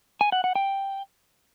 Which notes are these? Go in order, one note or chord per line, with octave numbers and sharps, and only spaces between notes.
G#5
F#5
F#5
G5